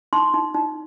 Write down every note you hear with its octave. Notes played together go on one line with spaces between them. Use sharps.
D#4 C6
D#4
D#4